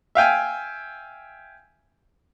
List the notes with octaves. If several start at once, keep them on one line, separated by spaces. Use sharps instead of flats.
E5 F5 G5 G#5